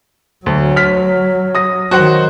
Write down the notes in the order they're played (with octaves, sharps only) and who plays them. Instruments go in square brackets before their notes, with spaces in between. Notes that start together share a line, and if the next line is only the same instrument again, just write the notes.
[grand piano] D2 [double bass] F#3
[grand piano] F6 B6
D#6 A#6
[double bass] D#3 F#3 [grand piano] F#4 C5 F#5